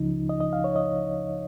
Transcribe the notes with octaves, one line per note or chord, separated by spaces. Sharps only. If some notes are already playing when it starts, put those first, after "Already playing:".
Already playing: C#2 C#3 F3 D#4
D#5
D#5
F5
C#5
D#5